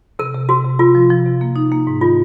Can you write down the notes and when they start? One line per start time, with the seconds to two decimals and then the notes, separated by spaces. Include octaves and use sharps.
0.19 C3 A#4
0.34 C3
0.49 C3 F#4
0.65 C3
0.79 C3 F4
0.95 F3
1.10 F3
1.26 C3
1.41 A#3
1.56 D#4
1.72 A#3
1.87 G#2
2.01 D#3 F4